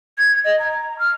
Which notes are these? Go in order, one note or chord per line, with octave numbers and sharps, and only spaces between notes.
G#6
D#5
A#5
F6